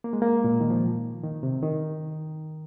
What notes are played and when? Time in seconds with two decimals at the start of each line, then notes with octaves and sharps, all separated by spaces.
0.04 A#3
0.13 G#3
0.22 A#3
0.44 A#2
0.60 D#3
0.70 F3
1.23 D#3
1.43 C3
1.63 D#3